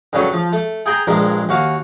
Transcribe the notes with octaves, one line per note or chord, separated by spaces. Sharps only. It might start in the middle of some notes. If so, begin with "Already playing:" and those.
G2 C#3 F#3 A3
F3
A3
G#4 G5 G#5 A#5
A#1 G2 G#3 A#4
D#2 F#4 F5